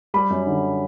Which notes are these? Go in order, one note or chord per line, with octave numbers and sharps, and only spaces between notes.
G3 B5
F#2
D3